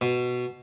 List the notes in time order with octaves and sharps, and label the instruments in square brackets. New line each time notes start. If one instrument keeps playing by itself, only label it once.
[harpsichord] B2